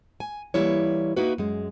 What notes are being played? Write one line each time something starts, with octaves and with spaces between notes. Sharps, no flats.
G#5
E3 G3 A#3 E4 C#5
A#3 D#4 E4 F#4 B4
F#2 G#3